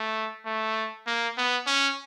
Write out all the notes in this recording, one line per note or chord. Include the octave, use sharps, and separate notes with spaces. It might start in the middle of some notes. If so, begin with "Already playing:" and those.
Already playing: A3
A3
A#3
B3
C#4